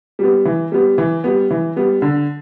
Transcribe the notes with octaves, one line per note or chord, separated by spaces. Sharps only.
G3 B3
E3
G3 B3
E3
G3 B3
E3
G3 B3
D3